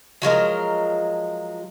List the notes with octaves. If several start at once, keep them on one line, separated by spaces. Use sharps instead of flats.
F3 F#3 G#3 A#4